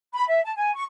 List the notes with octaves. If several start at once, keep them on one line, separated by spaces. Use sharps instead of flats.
B5
E5
A5
G#5
C#6